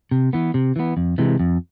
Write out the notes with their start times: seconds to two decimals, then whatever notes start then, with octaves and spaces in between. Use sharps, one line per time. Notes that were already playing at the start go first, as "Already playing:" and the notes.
0.11 C3
0.33 E3 B3
0.54 C3
0.76 E3 B3
0.97 F2
1.18 C3 E3 G#3
1.40 F2